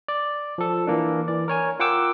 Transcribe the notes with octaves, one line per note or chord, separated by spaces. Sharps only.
D5
F3 A4
E3 A#3 D4
E3 D5
A#4 C#5 G#5
F4 A#4 F#5 G5 D6 E6